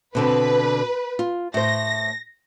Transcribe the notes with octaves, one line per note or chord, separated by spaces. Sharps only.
B2 D3 C4 B4
F4
A2 C5 A#6